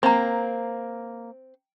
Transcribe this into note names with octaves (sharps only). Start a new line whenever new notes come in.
A#3 C4 A#5 B5